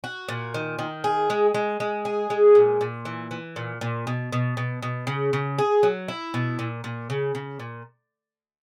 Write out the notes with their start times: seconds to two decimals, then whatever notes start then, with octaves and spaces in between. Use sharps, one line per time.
0.04 F#4
0.28 A#2
0.54 D#3
0.79 D#3
1.04 G#4
1.30 G#3
1.54 G#3
1.80 G#3
2.05 G#4
2.30 G#3
2.55 A#2
2.81 A#2
3.05 E3
3.31 E3
3.56 A#2
3.81 A#2
4.07 B2
4.32 B2
4.57 B2
4.82 B2
5.07 C#3
5.33 C#3
5.58 G#4
5.83 F#3
6.08 E4
6.34 B2
6.59 A#2
6.84 A#2
7.10 C#3
7.35 C#3
7.60 A#2